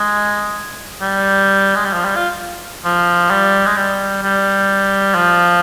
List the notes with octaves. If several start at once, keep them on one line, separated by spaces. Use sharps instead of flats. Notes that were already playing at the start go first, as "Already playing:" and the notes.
Already playing: G#3
G3
G#3
G3
F3
G3
F4
F3
G3
G#3
G3
G3
F3